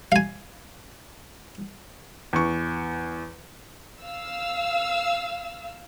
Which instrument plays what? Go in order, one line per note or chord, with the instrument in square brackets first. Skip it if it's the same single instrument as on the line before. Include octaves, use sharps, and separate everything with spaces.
[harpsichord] F5 G#5
[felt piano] E2 C#6
[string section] F5 E6